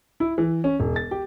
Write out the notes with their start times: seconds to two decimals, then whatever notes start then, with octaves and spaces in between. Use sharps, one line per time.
0.20 E4
0.38 E3
0.64 C#4
0.80 E1
0.96 A6
1.11 G4